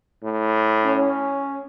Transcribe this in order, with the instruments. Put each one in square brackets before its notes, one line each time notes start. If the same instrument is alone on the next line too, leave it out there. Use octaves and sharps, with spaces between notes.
[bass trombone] A2
[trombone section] C#4